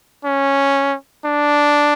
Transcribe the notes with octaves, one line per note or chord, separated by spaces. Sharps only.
C#4
D4